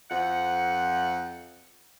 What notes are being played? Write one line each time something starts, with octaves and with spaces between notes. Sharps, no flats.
F2 F#5